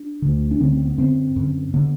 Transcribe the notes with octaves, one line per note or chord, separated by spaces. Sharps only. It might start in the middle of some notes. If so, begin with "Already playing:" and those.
Already playing: D4
D2 D3
D4
D2 D3 C4
C4
B3
F#2 D3 C4
F#2 D3
D3 B3